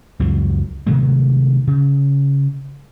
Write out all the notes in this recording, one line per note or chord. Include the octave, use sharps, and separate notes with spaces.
C#2 F#2 F3 F#3
C3 D#3 F#3 A3
C#3